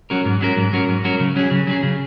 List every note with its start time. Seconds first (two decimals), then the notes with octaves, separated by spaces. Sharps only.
0.10 F#3 C#4 F#4 A#4
0.25 G#2
0.41 F#3 C#4 F#4 A#4
0.57 G#2
0.73 F#3 C#4 F#4 A#4
0.89 G#2
1.04 F#3 C#4 F#4 A#4
1.20 C#3
1.36 F#3 C#4 G#4
1.51 C#3
1.67 F#3 C#4 G#4
1.83 C#3